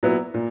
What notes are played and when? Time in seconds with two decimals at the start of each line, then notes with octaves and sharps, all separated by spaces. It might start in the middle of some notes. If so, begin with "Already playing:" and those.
0.03 A#2 F#3 B3 E4
0.34 A#2